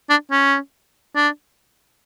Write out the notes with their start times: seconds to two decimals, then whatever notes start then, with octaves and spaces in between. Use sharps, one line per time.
0.10 D4
0.31 C#4
1.16 D4